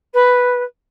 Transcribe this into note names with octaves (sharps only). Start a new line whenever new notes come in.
B4